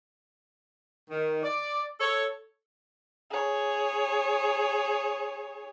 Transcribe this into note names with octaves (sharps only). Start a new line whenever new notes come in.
D#3
D5
A4 C#5
G#4 C#5